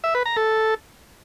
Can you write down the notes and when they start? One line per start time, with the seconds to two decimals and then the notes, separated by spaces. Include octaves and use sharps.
0.04 E5
0.15 B4
0.26 A#5
0.36 A4